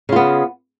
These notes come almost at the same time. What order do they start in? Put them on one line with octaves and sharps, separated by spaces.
C#3 F4 B3